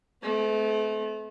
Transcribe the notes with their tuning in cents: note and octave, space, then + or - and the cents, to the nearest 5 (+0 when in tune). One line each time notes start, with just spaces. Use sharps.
A3 -35 C4 -45